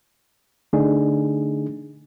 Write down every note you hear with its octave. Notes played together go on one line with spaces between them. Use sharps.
D3 A3 D4 D#4 G#4